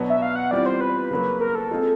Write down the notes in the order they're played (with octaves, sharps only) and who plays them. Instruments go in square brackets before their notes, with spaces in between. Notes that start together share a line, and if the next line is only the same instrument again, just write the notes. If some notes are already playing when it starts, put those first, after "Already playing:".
Already playing: [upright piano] B2 F#3 B3 D4 F#4
[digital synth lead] E5
F5
F#5
[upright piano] E3 G3 C4 F4 [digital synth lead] D5
[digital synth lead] C5
B4
[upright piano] C#3 F#3 A#3
[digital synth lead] A#4
A4
[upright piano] F3 G#3 C4 F4 G#4